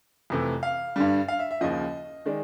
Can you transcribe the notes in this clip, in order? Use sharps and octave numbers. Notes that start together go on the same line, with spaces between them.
F2 C3 E3 A3
F5
G2 D3 G3
F5
E5
E5
D#2 C#3 F3 D#5
D#3 G#3 D5